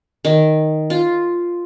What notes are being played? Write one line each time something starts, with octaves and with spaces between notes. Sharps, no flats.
D#3
F4